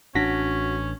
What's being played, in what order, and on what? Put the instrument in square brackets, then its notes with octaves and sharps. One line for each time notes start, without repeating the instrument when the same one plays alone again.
[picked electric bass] A1 D4 [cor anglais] C#4 [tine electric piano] F#4 A#6 B6